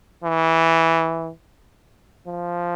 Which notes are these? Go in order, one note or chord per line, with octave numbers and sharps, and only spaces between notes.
E3
F3